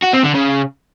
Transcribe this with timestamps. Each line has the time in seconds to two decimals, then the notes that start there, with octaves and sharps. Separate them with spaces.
0.04 F#4
0.14 C4
0.24 D3
0.34 C#3